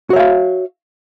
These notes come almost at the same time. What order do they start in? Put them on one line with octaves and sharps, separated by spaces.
F#4 C#5 E5 F5